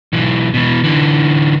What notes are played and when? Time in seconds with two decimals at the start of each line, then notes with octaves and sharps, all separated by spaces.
0.13 B1 E3
0.54 B2 E3
0.84 D3 E3